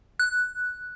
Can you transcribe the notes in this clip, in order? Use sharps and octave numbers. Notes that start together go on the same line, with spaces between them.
F#6